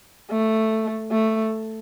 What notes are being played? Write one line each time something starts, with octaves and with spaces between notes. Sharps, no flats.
A3
A3